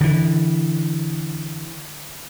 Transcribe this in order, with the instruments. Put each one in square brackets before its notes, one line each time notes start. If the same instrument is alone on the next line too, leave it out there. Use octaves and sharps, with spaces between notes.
[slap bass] D3 E3